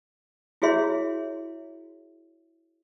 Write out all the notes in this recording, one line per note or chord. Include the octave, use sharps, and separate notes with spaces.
E4 F#4 G#4 C#5 E5 C6